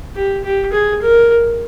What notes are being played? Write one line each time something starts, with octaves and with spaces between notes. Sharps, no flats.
G4
G4
G#4
A#4